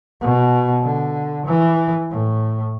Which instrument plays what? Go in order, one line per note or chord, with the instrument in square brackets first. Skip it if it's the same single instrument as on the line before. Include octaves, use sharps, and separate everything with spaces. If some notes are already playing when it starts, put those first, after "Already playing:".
[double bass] B2
D3
E3
A2